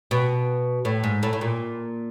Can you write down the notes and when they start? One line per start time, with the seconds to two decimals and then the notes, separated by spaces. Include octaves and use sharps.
0.11 B2
0.85 A2
1.04 G#2
1.23 A2
1.33 A2
1.41 A#2